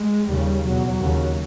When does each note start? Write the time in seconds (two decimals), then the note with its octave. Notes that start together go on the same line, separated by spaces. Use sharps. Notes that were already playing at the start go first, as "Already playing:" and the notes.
Already playing: G#3
0.28 D#2 C#3 G3
0.64 E2 B2 F#3
1.01 D#2 C#3